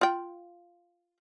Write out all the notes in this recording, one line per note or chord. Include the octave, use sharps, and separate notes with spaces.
F4 G5